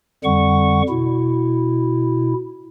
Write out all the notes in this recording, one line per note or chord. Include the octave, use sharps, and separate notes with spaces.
F2 D3 G3 F#5 C#6
B2 E4